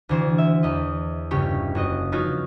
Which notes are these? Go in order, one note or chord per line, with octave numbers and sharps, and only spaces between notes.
D2 E3 C5
E5
E2 D#5
G1 C#3 G4 C#5
F#1 F#4 D#5
F3 B3 C#4 D#4 F4 F#4